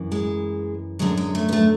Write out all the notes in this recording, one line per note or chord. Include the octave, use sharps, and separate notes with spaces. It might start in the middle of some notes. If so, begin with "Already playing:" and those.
Already playing: F#2 E3
G#3
F#2 D3 F#3 G#3
G#3
A3
B3
A3